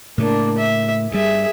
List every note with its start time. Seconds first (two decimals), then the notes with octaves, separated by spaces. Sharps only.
0.18 A2 C#3 A3 A#3 D4
0.58 E5
1.12 G2 G3 G#4 E5